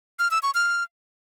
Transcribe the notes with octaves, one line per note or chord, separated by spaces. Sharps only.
F6
E6
C#6
F6